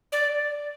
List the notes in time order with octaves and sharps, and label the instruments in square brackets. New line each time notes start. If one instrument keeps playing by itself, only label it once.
[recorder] D5